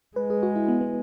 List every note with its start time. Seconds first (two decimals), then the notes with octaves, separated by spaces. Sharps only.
0.16 G#3 B4
0.30 G#4
0.43 F#4
0.56 E4
0.68 B3
0.81 B3